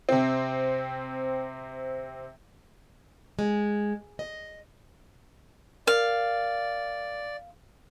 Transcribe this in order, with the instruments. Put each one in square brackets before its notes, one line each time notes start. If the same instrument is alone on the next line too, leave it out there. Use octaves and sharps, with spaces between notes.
[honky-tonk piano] C3 C4
[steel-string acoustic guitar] G#3
D#5
[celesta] A#4 [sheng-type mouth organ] D5 [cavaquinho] F5